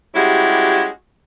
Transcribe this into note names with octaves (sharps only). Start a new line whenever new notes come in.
G3 G#3 C#4 E4 F#4 G4